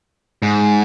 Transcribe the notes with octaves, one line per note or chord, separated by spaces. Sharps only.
G#2